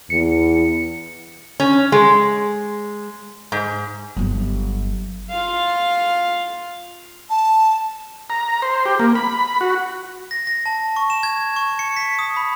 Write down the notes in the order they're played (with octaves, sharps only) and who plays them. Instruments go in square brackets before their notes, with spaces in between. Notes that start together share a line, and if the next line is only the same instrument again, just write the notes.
[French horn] E2 [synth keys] C#7
[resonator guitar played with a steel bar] C#4
G#3
G#2
[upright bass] G1 F#3
[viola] F4 F5
[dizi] A5
[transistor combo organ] A#5
C5
G4
A#3
B5
F#4
[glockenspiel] A#6
A#6
A5
C#6
E7
G#6
C#6
C#7
B6
D#6
B5